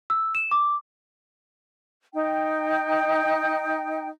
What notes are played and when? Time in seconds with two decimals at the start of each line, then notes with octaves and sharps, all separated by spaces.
0.10 E6
0.35 E7
0.51 D6
2.14 D#4 G5